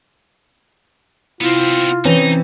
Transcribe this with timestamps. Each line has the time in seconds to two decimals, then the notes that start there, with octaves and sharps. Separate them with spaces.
1.41 C3 B3 C4 E4 F4
2.05 E3 C4 C#4 D#4 B4